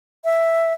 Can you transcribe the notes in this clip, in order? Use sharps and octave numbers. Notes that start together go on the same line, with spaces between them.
E5